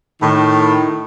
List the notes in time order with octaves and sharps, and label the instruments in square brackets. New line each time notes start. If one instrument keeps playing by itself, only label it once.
[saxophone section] A2 D#3